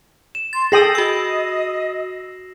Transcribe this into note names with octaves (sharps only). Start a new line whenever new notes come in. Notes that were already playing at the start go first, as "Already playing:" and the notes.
E7
C6 A6
G#4 A4 G5 D#6 A#6 C7 F#7
F#4 D#5 E6